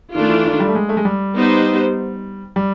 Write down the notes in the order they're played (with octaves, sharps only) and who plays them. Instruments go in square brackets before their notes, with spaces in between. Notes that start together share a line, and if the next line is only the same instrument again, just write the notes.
[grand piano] D#3 [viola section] A3 D4 F4
[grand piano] E3
D#3
G3
A3
G#3
A3
G#3
G3
[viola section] B3 D#4 G4 C5
[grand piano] G3